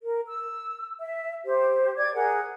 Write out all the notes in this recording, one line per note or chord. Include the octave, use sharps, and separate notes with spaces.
A#4
E6
E5
G4 C5
D5 D6 G#6
G#4 A#4 F#5